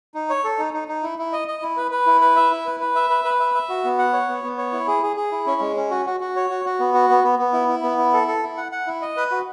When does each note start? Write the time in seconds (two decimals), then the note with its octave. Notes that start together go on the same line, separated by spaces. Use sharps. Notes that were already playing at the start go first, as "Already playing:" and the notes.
0.15 D#4
0.30 C#5
0.44 A4
0.59 D#4
0.73 D#4
0.88 D#4
1.03 E4
1.18 E4
1.33 D#5
1.48 D#5
1.62 E4
1.77 B4
1.91 B4
2.06 E4
2.21 B4
2.36 E5
2.51 E4
2.66 B4
2.80 B4
2.96 E5
3.10 B4
3.25 B4
3.40 E5
3.55 E5
3.69 F#4
3.84 B3
3.99 F#5
4.13 C#5
4.28 B3
4.44 B3
4.58 C#5
4.73 E4
4.88 G#4
5.03 G#4
5.17 G#4
5.32 E4
5.47 C#4
5.61 G#3
5.76 C#4
5.91 F#4
6.06 F#4
6.20 F#4
6.36 C#5
6.50 F#4
6.65 F#4
6.80 B3
6.94 F#4
7.10 B3
7.24 B3
7.39 B3
7.53 E4
7.68 E4
7.83 B3
7.98 E4
8.13 A4
8.27 A4
8.43 E4
8.57 F#5
8.72 F#5
8.87 E4
9.02 D#5
9.17 B4
9.32 F#4